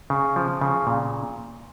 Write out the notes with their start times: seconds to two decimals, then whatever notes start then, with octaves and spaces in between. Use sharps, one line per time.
0.10 C#3
0.36 F3
0.62 C#3
0.87 A#2